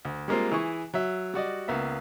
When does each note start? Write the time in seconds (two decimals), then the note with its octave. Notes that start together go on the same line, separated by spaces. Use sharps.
0.05 D2
0.28 G3 G#3 A#3 C4 F4
0.51 E3 E4 G#4 C#6
0.94 F#3 E5
1.34 G3 F#4 D5 D#5
1.68 C#2 A#3 B3 E5